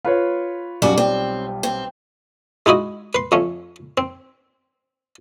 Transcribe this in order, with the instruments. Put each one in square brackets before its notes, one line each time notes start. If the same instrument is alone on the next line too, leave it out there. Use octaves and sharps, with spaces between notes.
[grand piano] F4 B4 C#5 [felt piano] B5
[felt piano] B1 G3 [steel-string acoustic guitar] F#2 F#4 D5
[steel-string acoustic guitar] C4
C4
[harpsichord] G#3 D#4 E4 F#4 D#5
B4 C6
F2 A3 C#4
C4